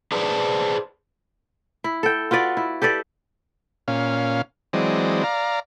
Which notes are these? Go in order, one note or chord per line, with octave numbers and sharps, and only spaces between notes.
G#4 B4 C5 D5 A5
E4
A4 G5
F4 F#4 B4 D5
E4
G4 A4 B4 D5
A#2 C#4 F5
E3 F#3 G#3 C4 D5 D#5
D5 F5 A#5